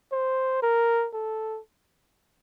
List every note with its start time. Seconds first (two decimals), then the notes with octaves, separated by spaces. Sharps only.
0.12 C5
0.62 A#4
1.13 A4